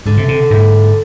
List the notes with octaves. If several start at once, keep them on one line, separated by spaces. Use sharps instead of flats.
G#2 D3
C3
C3
G#2